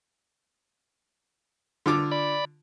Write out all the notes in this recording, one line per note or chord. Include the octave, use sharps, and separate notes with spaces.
D3 F4 D6
D5 B5